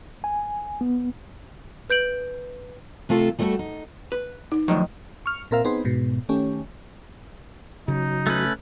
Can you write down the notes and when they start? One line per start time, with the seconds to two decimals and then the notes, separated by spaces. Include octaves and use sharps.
0.24 G#5
0.81 B3
1.90 B4 G6 D7 F#7
3.09 C3 A3 F4 A4
3.39 G3 A3 D#4 E4 F#4 A4
3.59 D#4
4.12 B4
4.52 D#4
4.68 F#2 D3 D#3 F3 F#3 A3
5.26 C#6 F6
5.51 A#2 C4 A#4 E5 F5
5.65 B3 C4 D#4 G#4 B4 C5
5.85 G#2 B2
6.29 D#3 A3 C#4 G4
7.88 C#3 F#3 D#4
8.27 A3 C#4 B4